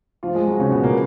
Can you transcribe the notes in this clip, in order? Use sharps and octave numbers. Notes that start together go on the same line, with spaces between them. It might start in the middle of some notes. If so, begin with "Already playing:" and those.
F3 F4
G#3 G#4
F#3 F#4
C#3 C#4
B2 B3
A#2 A#3